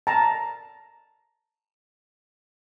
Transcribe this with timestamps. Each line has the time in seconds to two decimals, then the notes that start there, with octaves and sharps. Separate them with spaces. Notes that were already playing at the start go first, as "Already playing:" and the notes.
0.07 A5 A#5